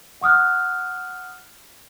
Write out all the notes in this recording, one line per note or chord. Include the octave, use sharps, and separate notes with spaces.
F#5 C#6 D#6 F6 F#6